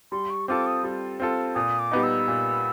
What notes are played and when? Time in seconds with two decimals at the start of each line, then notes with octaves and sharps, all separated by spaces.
0.12 G3 C6
0.30 C#6
0.48 C4 F4 A4 D6
0.67 D#6
0.83 G3
1.20 C4 F4 A4
1.55 A#2 D#6
1.79 D6
1.91 G3 B3 D#4
2.03 E6
2.28 A#2